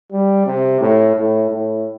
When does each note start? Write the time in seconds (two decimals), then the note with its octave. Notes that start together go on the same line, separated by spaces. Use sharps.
0.12 G3
0.47 C3
0.81 A2
1.16 A2
1.51 A2